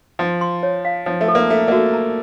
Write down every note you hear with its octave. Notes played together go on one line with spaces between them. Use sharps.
F3 C6
C6
C#5
F5
F3 C#5
A3
A4
A#3
A3 F5
A#3
A3 F#4
A#5